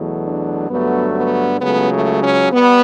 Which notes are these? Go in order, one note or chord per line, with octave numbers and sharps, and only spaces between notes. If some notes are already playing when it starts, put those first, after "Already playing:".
Already playing: E2 B2 F#3 A3
D4
G2 D3 F#3 A3 B3
B3
C#2 C#3 F#3 A3 B3
A3
C#4
G3 B3